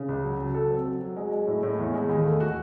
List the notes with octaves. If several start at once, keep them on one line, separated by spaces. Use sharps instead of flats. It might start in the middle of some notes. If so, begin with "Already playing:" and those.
Already playing: C#3
C#2
F#3
F#3
A4
C4
F#3
F#3
G#3
G#3
A2
A2
E2
G#3
D#2
A3
F#4